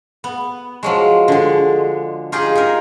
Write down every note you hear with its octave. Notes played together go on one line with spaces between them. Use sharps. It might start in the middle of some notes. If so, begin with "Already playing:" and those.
B3
F3 F#3 G#3
D3 G#3
D#4 F4 G4 G#4 D#5
D#4 A#4